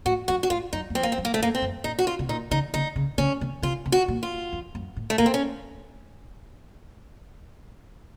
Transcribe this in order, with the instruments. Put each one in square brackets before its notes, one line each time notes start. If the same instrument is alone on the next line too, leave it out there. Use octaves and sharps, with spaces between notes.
[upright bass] A2 [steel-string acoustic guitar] F#4
[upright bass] F#2 [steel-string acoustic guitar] F#4
[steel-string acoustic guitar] F#4
[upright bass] A2 [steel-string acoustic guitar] F4
[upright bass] F#2 [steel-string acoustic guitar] D#4
[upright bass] F#2
[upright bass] F2 [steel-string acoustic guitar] C4
[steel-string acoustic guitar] A#3
C4
[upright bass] F#2
[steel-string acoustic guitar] A#3
A3
[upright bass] F#2
[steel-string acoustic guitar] A#3
C4
[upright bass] F#2
[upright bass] A#2 [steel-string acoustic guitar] D#4
[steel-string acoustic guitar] F#4
F4
[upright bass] C3
[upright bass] A#2 [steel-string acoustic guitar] D#4
[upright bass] C#3 [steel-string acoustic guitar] D#4
[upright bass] C#3 [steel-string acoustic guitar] D#4
[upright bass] C#3
[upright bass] C#3 [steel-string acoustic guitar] C#4
[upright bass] C3
[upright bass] C3 [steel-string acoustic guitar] F4
[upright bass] C3
[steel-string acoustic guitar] F#4
[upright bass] A#2
[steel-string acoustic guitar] F4
[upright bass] F2
F#2
A2
[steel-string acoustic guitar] A3
[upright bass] A2 [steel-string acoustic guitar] A#3
[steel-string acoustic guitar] C4
C#4